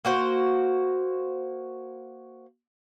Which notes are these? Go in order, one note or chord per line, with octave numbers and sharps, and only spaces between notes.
A#3 F#4 C5